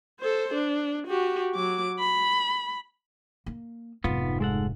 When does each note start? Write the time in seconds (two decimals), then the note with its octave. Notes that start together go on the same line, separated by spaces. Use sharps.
0.20 A4 C5
0.54 D4
1.07 F#4 G4
1.55 F#3 D6
1.99 B5
3.46 A#3
4.04 F1 G#2 B3 F4
4.40 G#3 A4 F#5